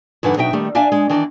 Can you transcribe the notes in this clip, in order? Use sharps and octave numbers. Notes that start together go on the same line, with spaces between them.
G2 D3 E3 D#4 B4 F#5
B2 F#3 D#4 E5 G5
D#3 G3 A3
D4 D5 E5 F5 G#5
G#3
D#3 E3 D4 D#5